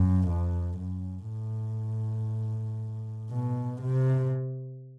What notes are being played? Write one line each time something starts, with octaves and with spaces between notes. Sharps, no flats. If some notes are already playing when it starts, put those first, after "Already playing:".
Already playing: F#2
F2
F#2
A2
B2
C3